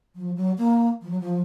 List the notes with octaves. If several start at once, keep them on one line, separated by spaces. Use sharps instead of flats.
F3
F#3
A#3
F3
F#3
F3